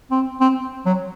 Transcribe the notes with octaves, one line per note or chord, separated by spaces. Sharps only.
C4
C4
F#3